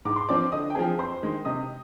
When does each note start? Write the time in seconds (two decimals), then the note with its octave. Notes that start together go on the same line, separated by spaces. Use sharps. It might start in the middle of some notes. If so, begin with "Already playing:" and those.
0.05 G#2 D6
0.16 C6
0.29 F3 C4 D5 D6
0.52 D3 D#5 D#6
0.70 G5
0.75 F3 C4 G#4 G#5
0.98 F2 C5 C6
1.23 D#3 G#3
1.45 C3 D#5 D#6